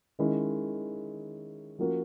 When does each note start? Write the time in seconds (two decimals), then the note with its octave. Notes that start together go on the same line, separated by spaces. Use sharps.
0.19 D#3 G#3 C#4 E4
1.79 F3 A#3 C#4 F#4 A#4